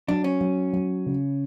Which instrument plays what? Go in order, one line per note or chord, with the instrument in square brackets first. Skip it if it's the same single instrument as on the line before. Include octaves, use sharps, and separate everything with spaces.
[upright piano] F#3 [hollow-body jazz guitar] D4
[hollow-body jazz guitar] C#4
[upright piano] F#3
F#3
C#3